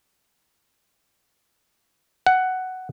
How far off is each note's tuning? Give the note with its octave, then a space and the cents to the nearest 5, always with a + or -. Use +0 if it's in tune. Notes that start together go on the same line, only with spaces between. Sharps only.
F#5 +10